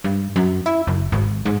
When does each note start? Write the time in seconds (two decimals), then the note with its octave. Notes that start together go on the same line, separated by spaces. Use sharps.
0.04 G2
0.36 F#2
0.66 E4
0.87 F#1
1.12 G#1
1.46 G#2